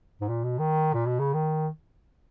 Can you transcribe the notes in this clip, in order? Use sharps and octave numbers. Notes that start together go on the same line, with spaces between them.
G#2
A#2
B2
D#3
A#2
B2
C#3
D#3